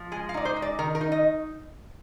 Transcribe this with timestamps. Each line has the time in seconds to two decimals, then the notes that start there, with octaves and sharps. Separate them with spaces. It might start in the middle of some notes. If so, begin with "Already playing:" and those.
Already playing: F3
0.12 G#3 G#5
0.29 F5
0.34 D#4 D5
0.45 C5
0.56 G#3
0.62 D5
0.79 D#3 A#4
0.95 A#4
1.01 D#4
1.12 D#5